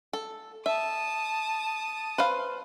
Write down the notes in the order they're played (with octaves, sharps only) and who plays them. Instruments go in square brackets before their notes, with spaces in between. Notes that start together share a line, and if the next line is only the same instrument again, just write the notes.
[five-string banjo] A4
[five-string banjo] E5 [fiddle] A5 D#6
[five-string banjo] B4 C5 F5